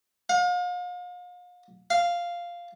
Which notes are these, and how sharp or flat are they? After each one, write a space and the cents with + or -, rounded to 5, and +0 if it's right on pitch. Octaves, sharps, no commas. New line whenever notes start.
F5 +40
F5 -5